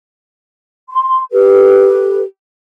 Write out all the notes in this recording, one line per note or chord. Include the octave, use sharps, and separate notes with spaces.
C6
G4 A4 B4